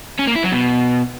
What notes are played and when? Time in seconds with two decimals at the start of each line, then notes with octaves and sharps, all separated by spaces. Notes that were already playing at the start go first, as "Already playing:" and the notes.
0.19 C#4
0.27 A#3
0.35 E4
0.44 F#3
0.52 B2